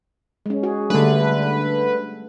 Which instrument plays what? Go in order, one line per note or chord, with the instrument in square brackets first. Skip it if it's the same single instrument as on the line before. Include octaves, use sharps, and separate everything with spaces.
[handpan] G#3 C#4
F#4 G#4
[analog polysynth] D3 B4 [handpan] G3 A3 D4